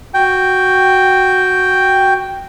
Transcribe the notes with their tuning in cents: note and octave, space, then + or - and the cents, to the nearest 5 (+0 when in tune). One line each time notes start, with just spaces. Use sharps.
F#4 +0 G5 +0